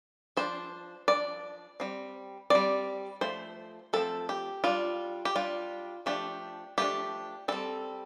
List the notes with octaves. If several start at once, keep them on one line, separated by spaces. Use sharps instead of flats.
F3 D4 C5
F3 D4 D5
G3 C4
G3 C4 D5
F3 A3 C5
F3 A3 C4 A4
G4
G3 D4 F4
G4
G3 D4 F4
F3 A3 D4 G4
F3 A3 D4 G4
G3 C4 A4